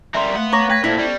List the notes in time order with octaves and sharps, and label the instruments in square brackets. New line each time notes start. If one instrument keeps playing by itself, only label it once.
[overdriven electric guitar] G3 A#4 [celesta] E5 C6
[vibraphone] A3 F5 [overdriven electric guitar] B3 F#5
[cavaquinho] C#5 [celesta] A#5 D6 A#6
[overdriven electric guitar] B4 [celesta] G5 G#6 A#6
[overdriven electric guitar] A#2 [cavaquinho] E4 [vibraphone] A4 C5 A5
[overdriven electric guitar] G3 [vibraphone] B3 C#4 C#6